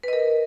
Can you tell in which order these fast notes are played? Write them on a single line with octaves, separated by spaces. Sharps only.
B4 D#5 A#4